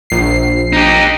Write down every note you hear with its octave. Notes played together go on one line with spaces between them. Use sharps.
A#1 C7
D#4 G4